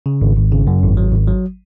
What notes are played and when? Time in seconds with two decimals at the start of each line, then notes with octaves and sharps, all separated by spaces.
0.06 C#3
0.22 G#1
0.36 G#1
0.52 C#3
0.67 F#2
0.83 G#1
0.97 F#3
1.13 G#1
1.28 F#3